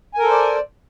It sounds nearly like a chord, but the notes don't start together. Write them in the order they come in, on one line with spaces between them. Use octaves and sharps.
G#5 A#4 A4 C5 D5